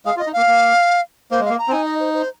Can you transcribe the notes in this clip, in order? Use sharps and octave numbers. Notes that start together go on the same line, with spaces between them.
G#3 G#4 F5
F4
D#5
D#4
A#3 F5
A#3
A#3 C5
G#3
F5
A#3
A#5
C4
D#4 G#5
D#5
C5
C5